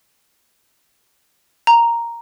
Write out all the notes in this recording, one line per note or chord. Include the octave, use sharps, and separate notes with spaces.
A#5